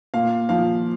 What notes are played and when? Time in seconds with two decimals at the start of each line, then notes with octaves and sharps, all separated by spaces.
0.14 A#2 F5
0.49 F3 F5